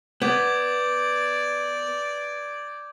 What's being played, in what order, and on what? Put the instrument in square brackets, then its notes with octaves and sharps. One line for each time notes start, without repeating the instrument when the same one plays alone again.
[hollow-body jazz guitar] B3 [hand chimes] B4 [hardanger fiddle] D5 [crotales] D6 G6 G#6